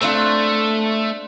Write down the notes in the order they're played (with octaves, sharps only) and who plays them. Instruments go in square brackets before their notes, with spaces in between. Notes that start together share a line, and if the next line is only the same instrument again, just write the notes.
[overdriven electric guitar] A3 [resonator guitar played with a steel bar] C4 D4 F4